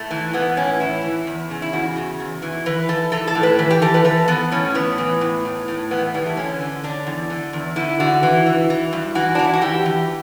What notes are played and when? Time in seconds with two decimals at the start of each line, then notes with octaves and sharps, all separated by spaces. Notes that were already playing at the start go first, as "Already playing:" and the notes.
Already playing: A2 A3
0.11 E3
0.33 E3 B3
0.57 A2 C#4
0.80 E3 E4
1.03 E3
1.27 E2
1.50 C#3
1.62 E4
1.73 E2 F#4
1.96 C#3
2.20 E2
2.42 E3
2.66 E3 B4
2.89 E3 A4
3.12 E3 A4
3.28 A4
3.35 A2
3.43 B4
3.59 E3
3.70 G4
3.82 E3 A4
3.94 B4
4.04 E3 A4
4.28 E3 B3
4.51 A2 C#4
4.75 A2 B3
4.98 E3
5.21 A2
5.45 A2
5.68 A2
5.91 E3 B3
6.14 E3 G3
6.26 A3
6.37 D3 C#4
6.61 D3
6.84 D3 D4
7.07 E2
7.30 D3
7.53 E2
7.76 D3 E4
8.00 D3 F#4
8.23 E3
8.46 E3
8.70 E3
8.93 G2
9.15 E3 F#4
9.35 E3 D4
9.44 E4
9.53 F#4
9.62 E3 G4
9.86 E3